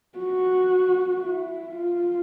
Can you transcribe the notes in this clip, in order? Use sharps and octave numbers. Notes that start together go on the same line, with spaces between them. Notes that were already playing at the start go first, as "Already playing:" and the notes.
F#4
E4
F4